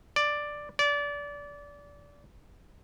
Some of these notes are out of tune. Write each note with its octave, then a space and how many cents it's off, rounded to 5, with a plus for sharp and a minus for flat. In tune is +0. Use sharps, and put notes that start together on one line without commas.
D5 +5
D5 -25